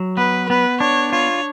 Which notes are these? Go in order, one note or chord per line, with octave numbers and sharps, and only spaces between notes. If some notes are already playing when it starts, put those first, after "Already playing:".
Already playing: F#3
B3 B4
B3 B4
D4 C#5
F4 C#5